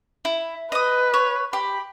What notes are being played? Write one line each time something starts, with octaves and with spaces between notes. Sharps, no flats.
E4
B4 D#5 D#6
C#5
G4 B5